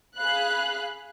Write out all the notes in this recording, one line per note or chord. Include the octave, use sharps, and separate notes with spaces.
G#4 F5 B5 F#6